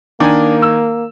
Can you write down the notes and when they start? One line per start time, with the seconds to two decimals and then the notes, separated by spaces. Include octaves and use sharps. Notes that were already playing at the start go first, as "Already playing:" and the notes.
0.20 D#3 A#3 D4 G#5
0.62 E6